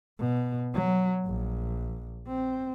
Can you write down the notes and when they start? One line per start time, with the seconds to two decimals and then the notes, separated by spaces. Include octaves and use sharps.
0.19 B2
0.74 F#3
1.26 A#1
2.28 C4